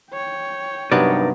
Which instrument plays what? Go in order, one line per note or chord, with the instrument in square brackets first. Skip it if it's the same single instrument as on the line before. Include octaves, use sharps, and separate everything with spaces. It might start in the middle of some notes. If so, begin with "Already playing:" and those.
[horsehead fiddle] C#5 G5
[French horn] G2 [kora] C3 F#3 B3 [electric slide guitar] D#4 A#4 D5